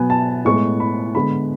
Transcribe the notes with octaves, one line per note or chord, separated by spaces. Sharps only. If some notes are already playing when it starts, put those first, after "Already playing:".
Already playing: B2 F#3 B3 G#5
A5
A2 G#3 B3 C#6
B5
D3 G#3 B3 B5